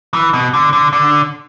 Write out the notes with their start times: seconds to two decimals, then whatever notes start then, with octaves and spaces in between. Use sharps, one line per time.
0.14 E3
0.33 B2
0.54 D3
0.73 D3
0.93 D3